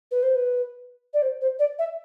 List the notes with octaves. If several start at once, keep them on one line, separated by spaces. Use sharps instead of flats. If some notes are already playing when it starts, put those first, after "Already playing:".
B4
C5
B4
D5
C5
C5
D5
E5